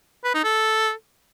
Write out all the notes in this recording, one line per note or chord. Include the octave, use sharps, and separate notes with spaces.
B4
D#4
A4